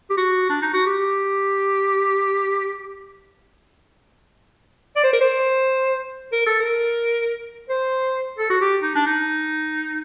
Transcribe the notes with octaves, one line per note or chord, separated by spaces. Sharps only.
G4
F#4
D4
D#4
F#4
G4
D5
C5
A#4
C5
A#4
A4
A#4
C5
A4
F#4
G4
D#4
D4
D#4